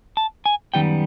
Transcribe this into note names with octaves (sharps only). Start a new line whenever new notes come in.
A5
G#5
F#2 D#3 G3 B3 G5